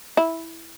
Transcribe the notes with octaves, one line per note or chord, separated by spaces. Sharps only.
E4